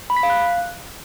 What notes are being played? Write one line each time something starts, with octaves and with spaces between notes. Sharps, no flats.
B5
B6
F5
F#6